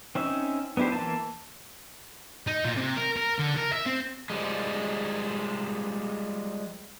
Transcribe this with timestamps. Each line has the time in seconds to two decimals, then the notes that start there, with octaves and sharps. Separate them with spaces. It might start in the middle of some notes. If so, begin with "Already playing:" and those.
0.15 C4 C#4 D#4 E5
0.77 B3 D4 E4 G4 C5
0.92 E3 A#3 E4 A5
2.47 D#4
2.64 A#2
2.77 C3
2.97 A#4
3.16 A#4
3.38 D3
3.56 A#4
3.72 E5
3.86 C4
4.30 F3 G3 G#3